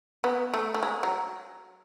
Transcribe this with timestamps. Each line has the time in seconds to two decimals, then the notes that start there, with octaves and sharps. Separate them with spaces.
0.24 B3
0.54 A3
0.74 A3
0.83 G#3
1.03 F#3